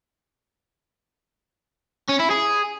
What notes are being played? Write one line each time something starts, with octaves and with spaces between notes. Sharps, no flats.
C#4
E4
G#4